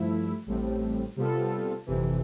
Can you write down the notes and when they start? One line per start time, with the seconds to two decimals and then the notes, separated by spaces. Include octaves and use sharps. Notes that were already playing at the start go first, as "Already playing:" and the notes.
Already playing: G2 F3 A3 E4
0.47 A1 A2 G3 C4
1.16 C3 G3 B3 F4 A4
1.86 G1 F2 C3 E3